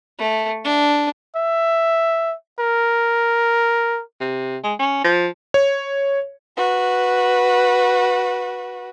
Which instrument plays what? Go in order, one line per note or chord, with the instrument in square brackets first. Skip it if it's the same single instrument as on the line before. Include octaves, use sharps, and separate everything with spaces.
[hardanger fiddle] A3
D4
[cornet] E5
A#4
[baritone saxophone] C3
G#3
C#4
F3
[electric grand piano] C#5
[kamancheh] F#4 B4